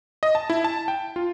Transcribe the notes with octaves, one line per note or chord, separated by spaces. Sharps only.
D#5
A5
E4
A5
G5
F4